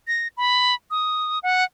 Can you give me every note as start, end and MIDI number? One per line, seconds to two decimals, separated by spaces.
0.07 0.28 94
0.37 0.75 83
0.91 1.39 87
1.43 1.64 78